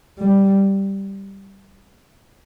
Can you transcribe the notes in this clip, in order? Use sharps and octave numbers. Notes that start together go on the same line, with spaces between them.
G3